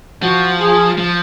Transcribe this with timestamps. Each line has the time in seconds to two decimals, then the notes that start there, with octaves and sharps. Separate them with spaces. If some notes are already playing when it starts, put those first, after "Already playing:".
0.22 F3 F#4
0.60 G#4
0.98 F3